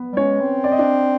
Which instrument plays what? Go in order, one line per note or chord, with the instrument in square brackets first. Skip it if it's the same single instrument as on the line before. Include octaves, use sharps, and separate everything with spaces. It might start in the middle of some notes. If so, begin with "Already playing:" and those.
Already playing: [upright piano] B3 B4
[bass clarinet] G3
[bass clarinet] G#3 [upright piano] C#4 C#5
[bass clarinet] C4
[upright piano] D5
D#5
D4 D5